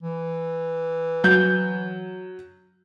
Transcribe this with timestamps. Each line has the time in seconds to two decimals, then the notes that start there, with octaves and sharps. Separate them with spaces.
0.03 E3
1.24 F#3 G6